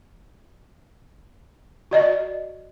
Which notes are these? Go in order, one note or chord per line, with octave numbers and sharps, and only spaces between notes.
F#4 D5 D#5